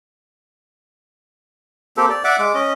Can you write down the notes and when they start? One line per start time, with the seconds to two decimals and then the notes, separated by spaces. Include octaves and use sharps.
1.97 A#3 C4 G4 A4
2.10 D5
2.24 D5 E5 F#5 D6
2.39 G#3 D6
2.54 C#4 D#5